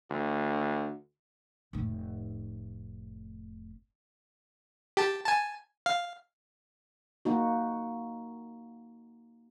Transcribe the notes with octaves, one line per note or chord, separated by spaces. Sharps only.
D2
F1 A2
G4 A5
G#5 A5
F5
A#3 D#4 F#4